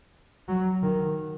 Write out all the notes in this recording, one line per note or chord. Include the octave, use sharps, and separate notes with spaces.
F#3
D#3